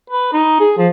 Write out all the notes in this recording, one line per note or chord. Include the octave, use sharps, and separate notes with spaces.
B4
D#4
G#4
F3